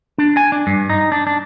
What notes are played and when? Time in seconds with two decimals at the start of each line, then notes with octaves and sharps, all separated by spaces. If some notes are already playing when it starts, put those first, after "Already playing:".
0.18 D4
0.37 G#5
0.52 D4
0.67 G2
0.90 D#4
1.12 D4
1.27 D4